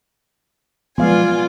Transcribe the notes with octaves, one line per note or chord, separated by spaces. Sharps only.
F3 F#3 G#3 B3 F4 D5 F5 G#5